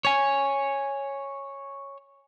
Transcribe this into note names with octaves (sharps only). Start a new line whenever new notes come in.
C#5 G#5